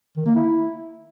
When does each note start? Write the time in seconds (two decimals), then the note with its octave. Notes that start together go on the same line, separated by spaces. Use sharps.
0.17 D#3
0.26 A#3
0.35 E4